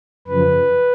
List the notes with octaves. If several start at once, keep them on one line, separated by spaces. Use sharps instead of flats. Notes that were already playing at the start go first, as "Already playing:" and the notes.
F#2 C#3 F3 B4